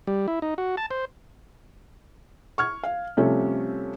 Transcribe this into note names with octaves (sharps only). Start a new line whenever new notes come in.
G3
E4
D#4
F#4
A5
C5
C#6 F6 G#6
F5
C3 F3 G3 A3 C#4